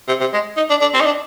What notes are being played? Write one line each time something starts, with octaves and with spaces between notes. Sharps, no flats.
C3
C3
G#3
D#4
D4
D4
C4
D#4
D4